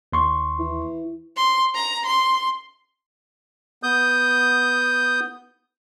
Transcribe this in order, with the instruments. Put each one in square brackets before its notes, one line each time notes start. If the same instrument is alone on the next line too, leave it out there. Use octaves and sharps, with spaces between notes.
[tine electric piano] D#2 C6 C#6
[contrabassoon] E3
[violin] C6
A#5
C6
[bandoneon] B3 D#6 G6